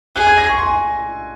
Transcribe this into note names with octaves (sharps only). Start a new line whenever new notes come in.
G#4 F#6
G#6
A#6
C#6
C6
G#5